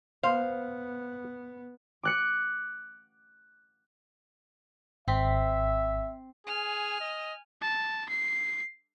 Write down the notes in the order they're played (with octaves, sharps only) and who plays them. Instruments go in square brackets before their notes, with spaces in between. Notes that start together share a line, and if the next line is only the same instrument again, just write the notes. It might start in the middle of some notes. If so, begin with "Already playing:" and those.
[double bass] B3 [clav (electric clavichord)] C5 [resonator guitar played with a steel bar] F5
[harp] D6 F#6 C#7
[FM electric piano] G#1 B6 [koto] C4 [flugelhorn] E5
[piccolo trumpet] G#4 [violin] G#5 F6
[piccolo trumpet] D#5
[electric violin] A5
C7